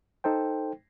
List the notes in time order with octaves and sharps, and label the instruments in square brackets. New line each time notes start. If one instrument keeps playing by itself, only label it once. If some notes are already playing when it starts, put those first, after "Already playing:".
[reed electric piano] D#4 A4 C5 G5